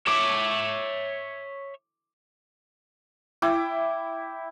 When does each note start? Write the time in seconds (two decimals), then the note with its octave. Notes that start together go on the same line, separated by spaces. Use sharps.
0.07 C#5 E5 D6
3.42 E4 G5 D6